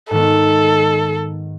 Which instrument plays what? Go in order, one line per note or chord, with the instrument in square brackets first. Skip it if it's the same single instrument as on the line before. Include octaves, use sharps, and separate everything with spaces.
[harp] G#2 D#3 B3 [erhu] A4